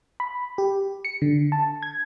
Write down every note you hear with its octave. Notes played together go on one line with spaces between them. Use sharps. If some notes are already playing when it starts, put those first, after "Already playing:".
B5
G4
C#7
D3
A5
G#6